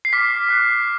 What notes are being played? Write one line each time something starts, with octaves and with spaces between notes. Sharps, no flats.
C7
D6 F6 B6
D6 F#6